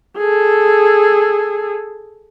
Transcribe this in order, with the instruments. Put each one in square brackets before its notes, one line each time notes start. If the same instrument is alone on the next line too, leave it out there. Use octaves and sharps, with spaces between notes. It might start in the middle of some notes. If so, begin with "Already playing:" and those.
[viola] G#4 A4